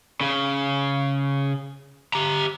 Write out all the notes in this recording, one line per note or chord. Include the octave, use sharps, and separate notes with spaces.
C#3
G4 A#5